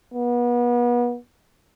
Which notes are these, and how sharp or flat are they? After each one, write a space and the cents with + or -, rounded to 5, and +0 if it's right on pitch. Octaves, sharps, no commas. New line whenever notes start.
B3 -35